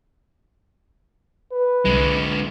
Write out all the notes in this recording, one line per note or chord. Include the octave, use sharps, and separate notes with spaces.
B4
C2 D3 G#3